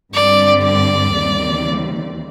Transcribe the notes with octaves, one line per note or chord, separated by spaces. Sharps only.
G2 D3 G3 C4 D5
D5
D#2 C#3 E3 G3 C4